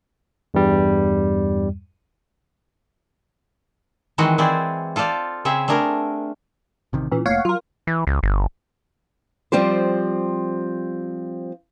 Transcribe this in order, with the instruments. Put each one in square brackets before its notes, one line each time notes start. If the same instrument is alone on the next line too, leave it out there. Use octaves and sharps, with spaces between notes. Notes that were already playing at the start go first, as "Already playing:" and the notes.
[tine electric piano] E2 G2 G3
[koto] D#3 E3 G#3 C4 F#4 D#5
C4 E4 G#4 C5 D5
F4 A4 C5 D5 F5
C#3 C4 G#4 E5
A3 D4 G#4 A#4
[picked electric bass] A1 C3 D#3
[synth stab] A#2 E3 [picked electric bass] C#4
[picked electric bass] F1 A3 A#3 [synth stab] C#5 F5 F#5
[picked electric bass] F#3 [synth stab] F4 A#4
[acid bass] E3
C#2
G1
[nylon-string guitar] F3 G3 C4 G4 C5